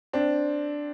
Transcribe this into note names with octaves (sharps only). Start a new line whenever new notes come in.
C4 D4